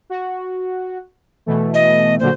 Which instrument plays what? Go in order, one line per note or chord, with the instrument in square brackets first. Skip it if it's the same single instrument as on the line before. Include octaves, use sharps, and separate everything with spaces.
[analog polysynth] F#4
B2 E3 A3
[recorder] D#5
[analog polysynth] A#2 D3 F#3 [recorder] C5